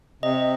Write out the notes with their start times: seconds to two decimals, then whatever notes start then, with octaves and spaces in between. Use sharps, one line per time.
0.23 C3 D#5